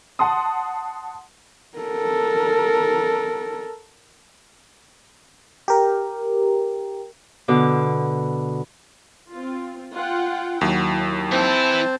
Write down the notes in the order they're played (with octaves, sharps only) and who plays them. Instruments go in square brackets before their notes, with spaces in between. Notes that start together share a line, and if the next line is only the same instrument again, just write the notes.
[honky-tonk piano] F#5 A5 C6 D#6
[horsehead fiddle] A4 A#4
[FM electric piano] G4 A#4
[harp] B2 D3 D6
[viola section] C4 F4
F4 F#5 G5
[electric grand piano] D#2 F#3 [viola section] E4
[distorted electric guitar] E3 E4 [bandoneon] C4 C5 [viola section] A5